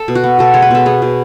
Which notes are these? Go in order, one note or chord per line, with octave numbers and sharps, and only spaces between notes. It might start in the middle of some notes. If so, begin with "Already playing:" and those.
Already playing: A4
B2
F#4
B3
B2 A4
G#3 C#5
B4
B2 A4
B3 G#4
B2